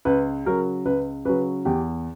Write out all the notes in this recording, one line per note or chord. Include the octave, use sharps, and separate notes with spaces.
C#2 B4
C#3 F#3 A#4
C#2 B4
C#3 F#3 B4
E2 G4